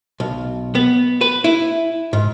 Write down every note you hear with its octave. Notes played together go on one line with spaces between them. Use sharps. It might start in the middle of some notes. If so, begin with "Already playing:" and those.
B1
B3
B4
E4
G#2